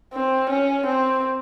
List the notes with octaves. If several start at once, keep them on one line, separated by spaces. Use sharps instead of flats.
C4
C#4
C4